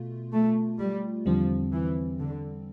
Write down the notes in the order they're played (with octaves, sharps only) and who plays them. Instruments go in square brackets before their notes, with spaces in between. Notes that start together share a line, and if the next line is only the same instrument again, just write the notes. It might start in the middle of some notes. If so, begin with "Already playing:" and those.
Already playing: [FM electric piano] B2 A3 F4
[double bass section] A3
G3
[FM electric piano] E2 D3 G3 C4 [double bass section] F3
[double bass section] E3
D3